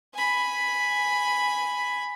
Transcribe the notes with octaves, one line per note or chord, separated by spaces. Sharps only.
G#5 B5